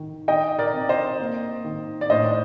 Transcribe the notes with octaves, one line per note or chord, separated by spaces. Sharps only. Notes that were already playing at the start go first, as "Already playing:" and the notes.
Already playing: D#3
D#3 D#5 G5
A#4 D5
C4
C5 D#5
A#3
D#3
D5
A2 C5 D#5